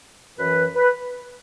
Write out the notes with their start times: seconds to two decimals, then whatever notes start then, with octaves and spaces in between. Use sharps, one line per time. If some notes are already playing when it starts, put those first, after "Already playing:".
0.37 F#2 E3 B4
0.75 B4